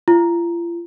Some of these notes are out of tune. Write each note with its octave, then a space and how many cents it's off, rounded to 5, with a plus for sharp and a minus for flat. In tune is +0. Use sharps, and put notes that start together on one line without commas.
F4 -40